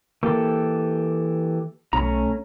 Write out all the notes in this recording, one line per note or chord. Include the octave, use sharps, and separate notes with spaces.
E3 A#3 G4 A4
B1 A3 C#4 A#5